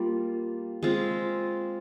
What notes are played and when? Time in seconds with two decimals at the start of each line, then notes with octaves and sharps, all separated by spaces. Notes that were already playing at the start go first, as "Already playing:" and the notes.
Already playing: G3 A#3 F4
0.83 G#3 C4 F4